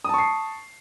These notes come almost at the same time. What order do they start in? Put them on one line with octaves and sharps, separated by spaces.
D#6 A5 C#6 C7